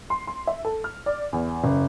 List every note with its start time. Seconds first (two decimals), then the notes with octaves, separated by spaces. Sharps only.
0.10 C6
0.27 C6
0.47 E5
0.65 A4
0.84 F6
1.06 D5
1.33 E2
1.64 F#1